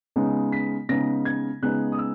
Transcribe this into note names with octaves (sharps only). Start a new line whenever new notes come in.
C#3 G#3 B3 D#4
B6
C#3 G#3 B3 D#4 A#6
G#6
C#3 G#3 B3 D#4 F#6
D#6
E6